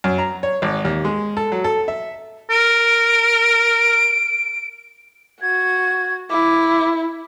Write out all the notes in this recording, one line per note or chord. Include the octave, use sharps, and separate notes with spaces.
F#2
A#5
C#5
G#1
D#2
G#3
A4
F#3
A4
E5
A#4 D7
F#4 G#6
E4 D6